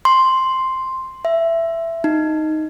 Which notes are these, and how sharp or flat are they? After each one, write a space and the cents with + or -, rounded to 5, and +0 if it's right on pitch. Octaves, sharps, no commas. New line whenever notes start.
C6 +0
E5 +10
D#4 +0